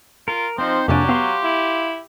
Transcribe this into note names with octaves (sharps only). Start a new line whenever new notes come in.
F4 A#4
F3 C4 D#4 C5
F2 C3 F#3 A#3 D4 G4 G#5
B3 F5 C6
E4